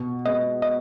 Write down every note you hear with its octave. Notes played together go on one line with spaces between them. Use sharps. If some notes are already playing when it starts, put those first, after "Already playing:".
Already playing: B2
G#3 B3 D#5
D#5